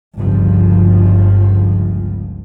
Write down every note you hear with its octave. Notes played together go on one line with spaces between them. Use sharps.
G1 C#2 G2 F3